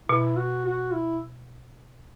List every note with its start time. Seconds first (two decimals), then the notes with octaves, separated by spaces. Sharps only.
0.08 B2 E4
0.37 F#4
0.65 F#4
0.93 E4